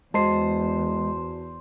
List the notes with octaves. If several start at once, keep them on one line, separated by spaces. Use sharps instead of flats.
E2 G#3 F#4 C5 D#5 A5 C7